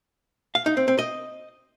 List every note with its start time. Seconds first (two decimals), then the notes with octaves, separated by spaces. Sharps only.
0.55 F5
0.66 D#4
0.77 C4
0.88 C4
0.99 D#5